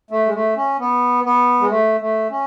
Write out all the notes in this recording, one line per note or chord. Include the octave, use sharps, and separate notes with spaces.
A3
G#3
A3
C#4
B3
B3
G#3
A3
A3
C#4